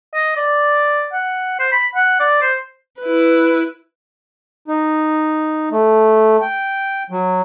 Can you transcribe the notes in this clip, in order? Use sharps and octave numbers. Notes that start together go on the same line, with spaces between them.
D#5
D5
F#5
C5
B5
F#5
D5
C5
E4 B4
D#4
A3
G5
F#3